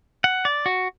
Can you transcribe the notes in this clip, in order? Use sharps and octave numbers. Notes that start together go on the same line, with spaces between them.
F#5
D5
F#4